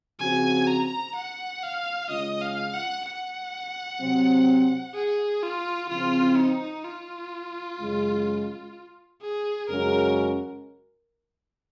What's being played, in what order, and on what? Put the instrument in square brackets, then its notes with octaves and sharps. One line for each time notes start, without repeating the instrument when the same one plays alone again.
[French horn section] C#3 F3 C4 F#4 [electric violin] G#5
[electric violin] A#5
F#5
F5
[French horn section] C#3 G#3 C#4 F4 [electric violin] D#5
[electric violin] F5
F#5
F#5
[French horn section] C3 F#3 C4
[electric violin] G#4
F4
[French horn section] C#3 F3 C4 [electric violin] F4
[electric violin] D#4
F4
[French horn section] F#2 C#3 G#3
[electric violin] G#4
[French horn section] F#2 C#3 G#3 C#4 F#4 [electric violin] A#4